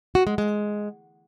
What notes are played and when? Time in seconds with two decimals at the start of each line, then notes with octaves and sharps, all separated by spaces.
0.15 F#4
0.27 G#3
0.38 G#3